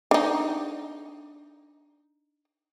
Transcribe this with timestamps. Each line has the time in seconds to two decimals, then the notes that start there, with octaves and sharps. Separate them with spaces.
0.11 D4 D#4